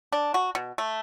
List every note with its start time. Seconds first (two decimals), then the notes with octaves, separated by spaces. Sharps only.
0.12 D4
0.34 F#4
0.55 B2
0.78 A3